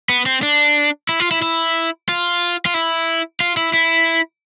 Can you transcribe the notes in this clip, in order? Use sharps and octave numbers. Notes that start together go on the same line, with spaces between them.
B3
C4
D4
E4
F4
E4
E4
F4
F4
E4
F4
E4
E4